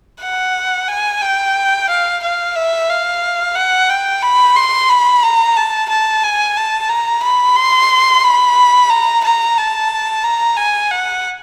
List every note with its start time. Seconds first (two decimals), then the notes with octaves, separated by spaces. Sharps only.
0.22 F#5
0.88 G#5
1.22 G5
1.90 F5
2.23 F5
2.56 E5
2.90 F5
3.56 F#5
3.90 G5
4.22 B5
4.56 C6
4.89 B5
5.23 A#5
5.57 A5
5.90 A5
6.23 G#5
6.57 A5
6.89 A#5
7.23 B5
7.56 C6
8.24 B5
8.90 A#5
9.24 A#5
9.58 A5
10.24 A#5
10.57 G#5
10.91 F#5